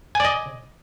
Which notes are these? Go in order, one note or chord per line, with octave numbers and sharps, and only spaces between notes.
D5 D#5 G#5